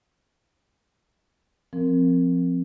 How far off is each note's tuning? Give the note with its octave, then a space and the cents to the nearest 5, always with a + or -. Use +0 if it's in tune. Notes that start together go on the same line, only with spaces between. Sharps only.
F3 +0 C4 +0 A#4 -15